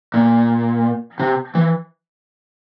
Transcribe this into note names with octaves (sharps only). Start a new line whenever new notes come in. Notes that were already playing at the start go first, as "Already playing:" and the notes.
A#2
C3
E3